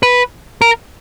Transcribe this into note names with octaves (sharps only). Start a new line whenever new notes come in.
B4
A#4